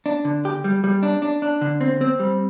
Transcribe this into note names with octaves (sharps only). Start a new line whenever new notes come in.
D4
D3
G4
G3
G3
D4
D4
D4
D3
C4
C4
G3